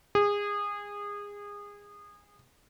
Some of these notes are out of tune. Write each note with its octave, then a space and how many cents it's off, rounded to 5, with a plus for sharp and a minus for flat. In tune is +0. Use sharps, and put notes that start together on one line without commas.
G#4 -25